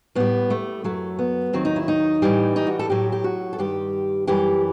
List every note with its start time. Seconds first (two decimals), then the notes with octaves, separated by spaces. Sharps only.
0.15 A2 G3 B3
0.50 A3
0.84 F#2 F#3 A3
1.19 B3
1.53 D#2 D#3 F#3 C4
1.65 D#4
1.76 E4
1.88 D#4
2.22 A2 E3 G3
2.56 D#4
2.67 F#4
2.79 A4
2.90 A2 F#3 G4
3.12 G4
3.24 F#4
3.53 A4
3.58 G2 D#3 G3 G4
4.27 F#2 E3 G3 G4